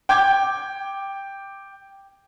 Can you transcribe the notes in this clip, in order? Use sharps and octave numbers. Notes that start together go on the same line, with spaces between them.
G5 D6 G6 G#6